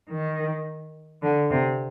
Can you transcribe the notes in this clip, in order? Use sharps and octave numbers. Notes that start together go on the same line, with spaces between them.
D#3
D3
C3